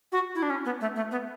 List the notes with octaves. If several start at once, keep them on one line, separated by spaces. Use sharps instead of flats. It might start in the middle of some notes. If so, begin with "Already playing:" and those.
F#4
E4
D4
C#4
B3
A3
A3
B3